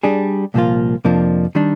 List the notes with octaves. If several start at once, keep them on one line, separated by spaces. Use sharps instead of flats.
G3 D4 G#4
C2 A#2 F3 A#3 F4
F2 C3 F3 A#3 D4
D#3 G3 D4